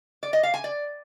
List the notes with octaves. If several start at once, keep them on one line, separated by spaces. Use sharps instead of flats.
D5
D#5
F5
G#5
D5